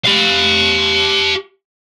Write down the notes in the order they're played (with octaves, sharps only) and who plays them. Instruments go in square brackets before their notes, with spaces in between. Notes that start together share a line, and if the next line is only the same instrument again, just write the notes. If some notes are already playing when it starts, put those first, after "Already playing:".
[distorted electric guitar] G4 F5